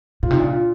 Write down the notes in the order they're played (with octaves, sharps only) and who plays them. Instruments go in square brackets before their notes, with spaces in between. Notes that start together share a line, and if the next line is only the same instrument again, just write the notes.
[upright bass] A#2 [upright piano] F4
[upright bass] C3 [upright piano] D#4
[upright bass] A#2 [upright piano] D4
[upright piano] F4